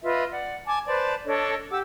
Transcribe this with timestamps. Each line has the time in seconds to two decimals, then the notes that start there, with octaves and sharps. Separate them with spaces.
0.03 F4 B4 D#5 E5
0.30 D5 F#5
0.66 G#5 A5 D6
0.87 B4 C5 D5 A5
1.26 D4 A4 C#5 D#5
1.70 G4 F#5 D6 E6